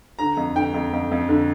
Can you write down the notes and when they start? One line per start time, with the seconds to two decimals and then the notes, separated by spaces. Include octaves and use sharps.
0.19 D3 A#5
0.37 F2
0.55 D3 G5
0.74 F2
0.93 F2
1.11 F2
1.29 D3